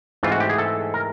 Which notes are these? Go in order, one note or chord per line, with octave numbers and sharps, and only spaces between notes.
G#2 E3 A3 C4 F4
F#4
G4
G#4
A4
A#4